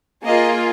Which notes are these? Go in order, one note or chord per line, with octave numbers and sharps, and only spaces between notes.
A#3 F4 G#4 D#5